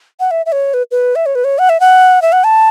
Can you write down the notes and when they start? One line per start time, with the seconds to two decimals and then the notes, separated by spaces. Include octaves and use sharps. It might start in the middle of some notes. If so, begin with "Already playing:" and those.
0.20 F#5
0.31 E5
0.46 E5
0.52 C#5
0.74 B4
0.91 B4
1.15 E5
1.26 C#5
1.35 B4
1.44 C#5
1.59 F#5
1.69 E5
1.80 F#5
2.22 E5
2.32 F#5
2.44 A5